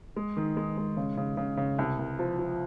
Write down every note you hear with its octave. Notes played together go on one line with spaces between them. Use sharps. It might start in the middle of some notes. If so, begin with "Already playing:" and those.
G#3
D#3
G#3
G#3
C#3
C#3
C#3
C#3
C2
C2
F3
F3